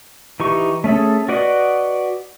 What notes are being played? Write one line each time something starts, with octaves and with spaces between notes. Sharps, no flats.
E3 D#4 G4 C#6
A3 C#4 G#4 A4
F#4 B4 D5 D#5 F#5